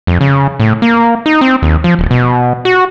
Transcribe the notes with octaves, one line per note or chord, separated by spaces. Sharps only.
F2
C#3
A2
A#3
D#4
C4
D#2
F3
D1
B2
F#4